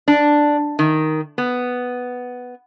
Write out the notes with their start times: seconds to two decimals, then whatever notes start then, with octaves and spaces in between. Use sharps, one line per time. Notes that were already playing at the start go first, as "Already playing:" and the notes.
0.08 D4
0.79 D#3
1.38 B3